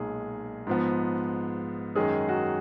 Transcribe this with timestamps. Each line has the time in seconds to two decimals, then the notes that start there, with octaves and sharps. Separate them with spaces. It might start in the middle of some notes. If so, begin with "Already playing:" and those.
Already playing: B1 A#2 G#3 D#4 G#4
0.67 G#2 F3 B3
1.96 F#2 D#3 G#3 D#4 G#4
2.29 F#4